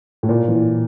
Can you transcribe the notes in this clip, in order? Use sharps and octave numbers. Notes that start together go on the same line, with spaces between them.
A2
A#2
E3